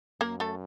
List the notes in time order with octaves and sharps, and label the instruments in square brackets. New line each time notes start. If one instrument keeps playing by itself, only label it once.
[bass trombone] F#2 [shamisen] A#3 A#4
[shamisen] A3 A4